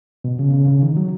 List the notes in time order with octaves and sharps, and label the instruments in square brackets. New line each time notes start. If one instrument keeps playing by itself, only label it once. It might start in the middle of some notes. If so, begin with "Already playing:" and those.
[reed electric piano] B2
C#3
C#3
C#3
D#3
F#3